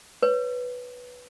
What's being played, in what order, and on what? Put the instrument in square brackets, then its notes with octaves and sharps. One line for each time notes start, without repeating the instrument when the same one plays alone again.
[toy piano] B4 C#5